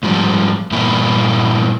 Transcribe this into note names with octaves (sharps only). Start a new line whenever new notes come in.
G#2 F3 G3
G2 A#2 E3 A#3 E4